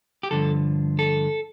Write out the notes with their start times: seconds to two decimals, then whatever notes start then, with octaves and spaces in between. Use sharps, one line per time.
0.23 G4
0.31 G2 D3 F3 A4
0.99 A4